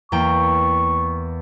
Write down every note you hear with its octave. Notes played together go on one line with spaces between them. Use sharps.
E2 A#3 G5 C#6